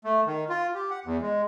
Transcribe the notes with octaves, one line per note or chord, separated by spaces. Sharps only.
A3
D#3
F4
G4
F#5
E2
G#3